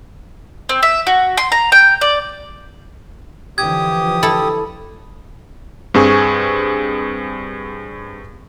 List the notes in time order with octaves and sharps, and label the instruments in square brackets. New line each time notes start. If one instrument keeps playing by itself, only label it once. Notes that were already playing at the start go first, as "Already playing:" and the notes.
[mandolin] C4
E5
F#4
C6
A#5
G5
D5
[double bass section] D3 E3 F3 [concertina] G4 D#6 [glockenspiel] G#6
[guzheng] E4 A4 [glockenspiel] B5
[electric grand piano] G2 C4 G#4 G#5 C#6